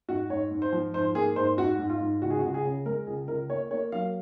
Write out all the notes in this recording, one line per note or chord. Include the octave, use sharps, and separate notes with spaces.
G#2 F#4
G#2 C#5
G#2
C5
F3
G#2 C5
A#3 G#4
G#2 C5
G#2 F#4
G#2
F4
G#2
C#2 F#4
G#4
F#4
C#2
G#4
C#3
G#3 A#4
C#2 G#4
C#2 A#4
A#3 C#5
A#3 C#5
F#3 F5